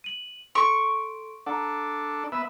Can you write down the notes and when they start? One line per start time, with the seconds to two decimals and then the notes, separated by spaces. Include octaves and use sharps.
0.04 D#7 F#7
0.55 A4 C6 C#6 D7
1.46 D4 A4 F#5 A#5
2.32 B3 E5